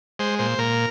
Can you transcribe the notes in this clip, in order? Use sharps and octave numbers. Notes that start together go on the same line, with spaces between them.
G#3 C5
A#2 C5
A#2 A#4